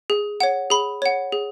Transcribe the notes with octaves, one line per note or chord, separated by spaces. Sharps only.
G#4
C#5 F#5
G#4 B5
C#5 F#5
G#4